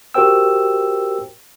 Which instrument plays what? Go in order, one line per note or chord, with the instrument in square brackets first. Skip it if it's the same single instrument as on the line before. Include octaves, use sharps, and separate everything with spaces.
[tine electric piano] F#4 G4 A#4 C5 G5 E6